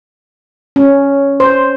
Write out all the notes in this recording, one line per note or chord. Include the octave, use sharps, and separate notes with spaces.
C#4
C5